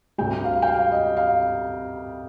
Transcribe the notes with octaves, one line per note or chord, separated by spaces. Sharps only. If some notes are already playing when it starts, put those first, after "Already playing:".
D2 C3 G3 G5
F5
G5
F5
D#5
F5